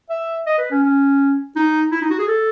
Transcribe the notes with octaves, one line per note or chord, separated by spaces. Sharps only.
E5
D#5
B4
C#4
C#4
D#4
E4
D#4
F#4
G#4
A4